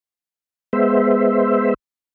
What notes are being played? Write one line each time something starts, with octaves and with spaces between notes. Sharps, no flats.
G#3 B3 C5 E5